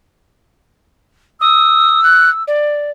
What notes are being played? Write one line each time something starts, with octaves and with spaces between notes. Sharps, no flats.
D#6 E6
F#6
D5